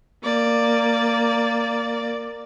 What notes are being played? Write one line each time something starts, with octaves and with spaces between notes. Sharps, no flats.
A#3 D5